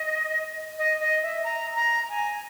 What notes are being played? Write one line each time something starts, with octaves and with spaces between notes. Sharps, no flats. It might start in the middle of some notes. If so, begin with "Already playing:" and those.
Already playing: D#5
D#5
D#5
E5
A#5
A#5
G#5